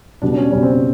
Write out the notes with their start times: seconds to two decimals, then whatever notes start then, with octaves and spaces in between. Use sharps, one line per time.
0.22 B2 G3 D4
0.32 D4
0.37 C#4
0.52 B2 G3 C#4
0.63 C4
0.72 C#4